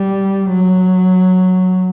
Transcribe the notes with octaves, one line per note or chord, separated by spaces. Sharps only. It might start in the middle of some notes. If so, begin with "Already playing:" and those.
Already playing: G3
F#3